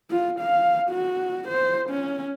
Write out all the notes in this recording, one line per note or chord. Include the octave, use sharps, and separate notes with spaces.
F4
F5
F#4
C5
C#4